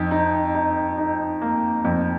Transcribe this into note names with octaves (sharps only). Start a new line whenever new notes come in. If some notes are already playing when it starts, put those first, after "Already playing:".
Already playing: F2 D#4
D#4
D#4
D#4
A#3
F2